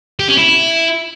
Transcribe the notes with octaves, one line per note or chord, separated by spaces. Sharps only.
G4
C#4
E4